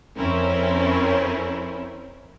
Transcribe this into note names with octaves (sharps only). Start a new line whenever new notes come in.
F2 C4 C#4 E4 A#4